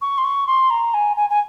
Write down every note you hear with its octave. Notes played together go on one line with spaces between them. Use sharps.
C#6
C6
C#6
C6
A#5
G#5
G#5
G#5